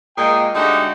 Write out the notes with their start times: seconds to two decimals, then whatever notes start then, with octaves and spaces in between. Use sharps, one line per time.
0.17 A#2 G#3 A#3 G#4 D#5 G5
0.54 D3 G#3 A3 D#4 F#4 G4